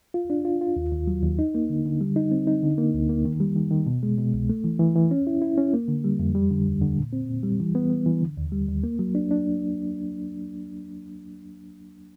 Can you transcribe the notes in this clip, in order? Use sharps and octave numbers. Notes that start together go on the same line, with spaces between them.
F4
D4
F4
F4
D#2
D#2
F#3
D#2
D#4
A#3
D3
D3
G3
D#4
C4
D#4
D3
A#3
D2
A#3
D#3
G3
D#3
D#3
B2
G#3
B2
C2
A3
E3
E3
E3
C#4
E4
E4
C#4
A#3
D3
G3
F2
G3
D3
D#2
D3
A#2
C4
A#2
G3
E3
B3
B3
E3
D3
D#2
G3
D#2
A#3
F#3
D4
D4